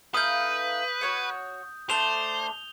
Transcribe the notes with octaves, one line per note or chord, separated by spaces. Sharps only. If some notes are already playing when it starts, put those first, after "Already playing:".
A3 D#4 B4 F5 D#6 G6
F#4 C#5 F#5
A3 D4 C5 F7 G7